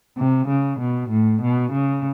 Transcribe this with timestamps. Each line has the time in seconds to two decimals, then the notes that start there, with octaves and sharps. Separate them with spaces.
0.17 C3
0.49 C#3
0.80 B2
1.11 A2
1.42 B2
1.73 C#3